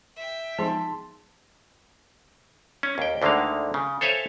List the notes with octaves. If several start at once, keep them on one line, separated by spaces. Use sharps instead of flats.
E5 G5
F3 G#3 B3 D#4 G#4 A5 C6
C#4
D#2 G5
D2 D3 D#3 G#3 A#3 F5
C#3
A4 C5 C#5 E5 F5 G#5